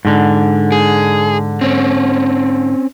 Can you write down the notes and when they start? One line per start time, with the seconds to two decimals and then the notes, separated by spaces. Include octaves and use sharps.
0.05 G#2 D3
0.72 G#4
1.61 C4 C#4